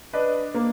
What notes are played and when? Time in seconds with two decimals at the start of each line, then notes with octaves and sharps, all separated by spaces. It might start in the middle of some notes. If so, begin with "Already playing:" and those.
0.13 D4 B4 D#5
0.54 A#3